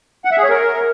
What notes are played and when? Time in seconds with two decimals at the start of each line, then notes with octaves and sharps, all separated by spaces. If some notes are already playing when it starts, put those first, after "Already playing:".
0.25 F#5
0.31 E5
0.37 G#4
0.43 C#5
0.49 A#4